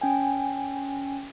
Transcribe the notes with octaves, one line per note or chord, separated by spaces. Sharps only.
C#4 G5 G#5